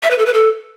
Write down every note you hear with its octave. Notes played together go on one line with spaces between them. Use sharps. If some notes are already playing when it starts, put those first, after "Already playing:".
E5
B4
A4
B4
A4